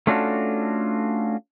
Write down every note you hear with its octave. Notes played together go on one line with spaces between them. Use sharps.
A3 C#4 D4 F4 F#4 A4